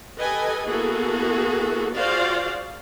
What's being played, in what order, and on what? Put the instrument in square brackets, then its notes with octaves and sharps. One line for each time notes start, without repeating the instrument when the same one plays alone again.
[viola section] G4 A4 B4 D#5 G#5
A#3 B3 E4 F#4 G#4 A4
F4 F#4 G#4 C5 D5 F5